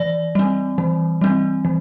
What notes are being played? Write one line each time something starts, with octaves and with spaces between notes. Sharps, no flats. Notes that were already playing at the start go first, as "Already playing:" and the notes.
Already playing: E3 D5
G3 C4
E3
G3 C4
E3